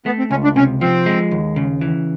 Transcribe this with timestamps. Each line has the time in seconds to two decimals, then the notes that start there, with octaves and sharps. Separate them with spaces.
0.06 A3 B3
0.19 C4
0.31 C#2 C#4
0.44 D4
0.56 C3 C#4
0.81 F3 C4
1.06 G#3
1.31 D#2
1.56 C#3
1.81 E3